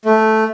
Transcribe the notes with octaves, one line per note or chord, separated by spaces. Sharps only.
A3